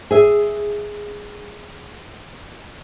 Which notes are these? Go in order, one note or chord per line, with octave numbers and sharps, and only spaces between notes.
G#4 E5